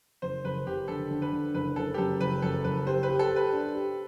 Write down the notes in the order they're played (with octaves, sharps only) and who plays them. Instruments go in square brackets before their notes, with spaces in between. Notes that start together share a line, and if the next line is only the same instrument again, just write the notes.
[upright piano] F#1 [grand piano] C5
[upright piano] F#1 [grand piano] B4
[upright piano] F#1 [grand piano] G4
[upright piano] D3 [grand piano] A4
[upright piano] D3
[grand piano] B4
[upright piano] D3
[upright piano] F#1 [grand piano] B4
[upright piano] F#1 [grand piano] A4
[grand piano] G4
[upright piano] F#2 [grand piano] A4
[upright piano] F#1 [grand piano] B4
[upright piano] F#2 [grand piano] A4
[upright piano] F#1 [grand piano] B4
[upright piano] G4 [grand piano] C5
[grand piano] B4
[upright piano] G4
[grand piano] A4
[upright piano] G4
[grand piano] B4
[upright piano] D4
G4